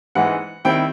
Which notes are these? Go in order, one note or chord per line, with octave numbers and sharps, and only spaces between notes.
G#2 E3 G#3 F#5
D#3 G3 C4 E4 G5